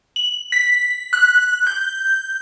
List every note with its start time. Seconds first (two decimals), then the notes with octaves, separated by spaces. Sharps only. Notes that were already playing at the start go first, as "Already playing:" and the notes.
0.16 F#7
0.52 B6
1.13 F#6
1.67 G6